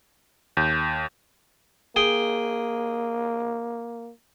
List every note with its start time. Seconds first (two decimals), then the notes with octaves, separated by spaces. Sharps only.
0.57 D#2 G6
1.96 A#3 G#4 G5